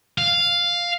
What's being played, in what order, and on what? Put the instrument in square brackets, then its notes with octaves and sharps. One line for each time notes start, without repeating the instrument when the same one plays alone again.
[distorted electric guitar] F5